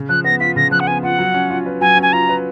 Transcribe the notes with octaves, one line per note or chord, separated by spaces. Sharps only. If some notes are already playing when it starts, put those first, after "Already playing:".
Already playing: C#3
F3 F#6
B3 A#6
F4 B6
C#3 A#6
F3 F#6
F#5
B3 G#5
F4 F#5
F#3
C#4
F4
B4
F#3 G#5
C#4
G#5
F4 A#5
B4